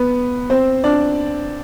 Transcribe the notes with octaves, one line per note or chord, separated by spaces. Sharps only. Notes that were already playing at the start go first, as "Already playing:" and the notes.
Already playing: B3 B4
C4 C5
D4 D5